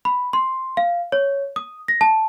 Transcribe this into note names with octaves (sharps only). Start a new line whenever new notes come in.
B5
C6
F5
C#5
D#6
A#6
A5